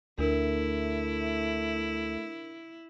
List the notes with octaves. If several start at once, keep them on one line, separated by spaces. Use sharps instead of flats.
D2 A3 D4 E4 A#4